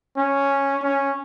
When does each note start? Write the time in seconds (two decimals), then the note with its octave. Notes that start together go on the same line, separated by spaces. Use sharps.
0.17 C#4
0.83 C#4